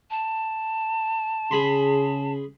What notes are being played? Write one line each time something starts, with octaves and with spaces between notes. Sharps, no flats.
A5
C#3 G#4 B5 C6